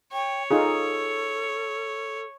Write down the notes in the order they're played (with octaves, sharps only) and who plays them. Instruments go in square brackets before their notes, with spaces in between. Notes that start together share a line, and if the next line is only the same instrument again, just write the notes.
[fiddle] C#5 [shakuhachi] G5
[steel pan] D#4 F4 G#4 [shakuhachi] A4